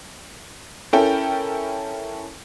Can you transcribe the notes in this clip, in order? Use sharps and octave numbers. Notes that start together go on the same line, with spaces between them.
C#4 E4 A4 A#4 G5